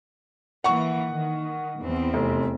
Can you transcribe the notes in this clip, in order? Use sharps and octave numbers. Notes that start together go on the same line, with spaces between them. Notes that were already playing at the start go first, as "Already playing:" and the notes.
E3 A#3 F#5 C#6
D#3
E2 C4
F1